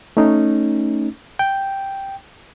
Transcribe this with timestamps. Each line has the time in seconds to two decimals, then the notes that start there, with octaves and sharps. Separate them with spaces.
0.17 A3 C#4 D#4
1.39 G5